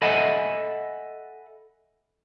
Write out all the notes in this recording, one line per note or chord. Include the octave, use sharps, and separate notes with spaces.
A4 D#5 E5 F#5 G#5 B5